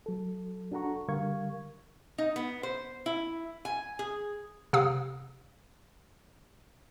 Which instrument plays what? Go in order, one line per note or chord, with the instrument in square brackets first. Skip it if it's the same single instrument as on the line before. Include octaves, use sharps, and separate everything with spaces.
[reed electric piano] F#3 A4
D4 F#4 A4 F#5 A#5 C#6
D3 G3 A#4 F5 C#6 G#6
[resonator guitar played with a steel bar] D#4
B3
C5
E4
G#5
G#4
[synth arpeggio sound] C3 F5 D#6